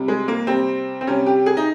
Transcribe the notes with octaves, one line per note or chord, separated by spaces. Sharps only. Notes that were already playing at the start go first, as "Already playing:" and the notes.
Already playing: C3 G3
G#3
A#3
C3 G3 C4
C4
C3 G3 C#4
G4
G#4
D#4